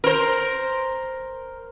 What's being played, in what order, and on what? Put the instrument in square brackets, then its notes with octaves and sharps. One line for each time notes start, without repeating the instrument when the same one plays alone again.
[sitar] A#4 C5